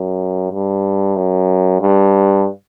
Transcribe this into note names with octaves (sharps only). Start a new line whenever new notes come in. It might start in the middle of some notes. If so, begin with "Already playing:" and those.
Already playing: F#2
G2
F#2
G2